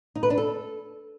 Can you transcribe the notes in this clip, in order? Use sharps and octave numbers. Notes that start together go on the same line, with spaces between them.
D#4
B4
D4
A4